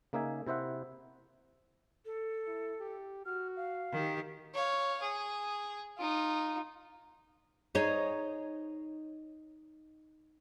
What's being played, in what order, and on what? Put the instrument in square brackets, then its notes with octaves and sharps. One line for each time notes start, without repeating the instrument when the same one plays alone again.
[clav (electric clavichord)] C#3 A#3 D#4 E5 G#5
C3 E4 C5 E5 F#5
[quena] A4
[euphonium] E4
G4
[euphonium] F#4 [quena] F6
[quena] F5
[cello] D#3 G4
[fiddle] C#5 F5
G#4
D#4 F4
[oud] D#4 G#4 C#5